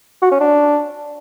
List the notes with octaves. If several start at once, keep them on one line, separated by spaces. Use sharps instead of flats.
F#4
C#4
D4